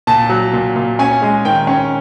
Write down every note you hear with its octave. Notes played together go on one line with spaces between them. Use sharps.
A#2 A5
F#3
A#2
A#2
C#4 G#5
G#3
D#3 G5
C#4